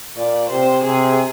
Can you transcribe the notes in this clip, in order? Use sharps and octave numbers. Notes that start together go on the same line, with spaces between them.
A#2 D5
C3 C5
C3 G#4